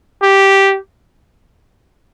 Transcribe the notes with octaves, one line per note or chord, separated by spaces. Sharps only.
G4